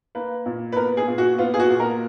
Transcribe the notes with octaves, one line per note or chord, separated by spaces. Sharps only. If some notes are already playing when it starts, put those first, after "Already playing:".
A#3 B4
A#2
B4
B3 A#4
G#4
A#2
F#4
B3 F4
G#4
F#4
A#2
A#4